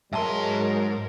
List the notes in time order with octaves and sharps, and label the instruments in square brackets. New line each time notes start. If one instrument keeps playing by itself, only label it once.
[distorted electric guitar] G#2 C6 [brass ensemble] F#3 G#3 [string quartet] A#4 [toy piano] E5 A5 A#5